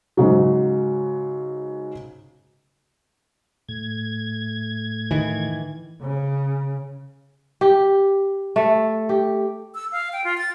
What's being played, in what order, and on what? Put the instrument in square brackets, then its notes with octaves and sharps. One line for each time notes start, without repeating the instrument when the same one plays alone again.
[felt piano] G#2 C#3 F#3
[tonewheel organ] A2 G#6
[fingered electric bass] D#3 E3
[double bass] C#3
[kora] G4
A3
G4
[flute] E6
F5
G5
F4
A6